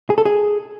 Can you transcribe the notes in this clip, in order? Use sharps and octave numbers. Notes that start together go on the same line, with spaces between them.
G#4
A4
G#4